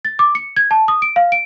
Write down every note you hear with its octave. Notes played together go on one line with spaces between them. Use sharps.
A6
D6
C#7
G#6
A5
D#6
D7
F5
D7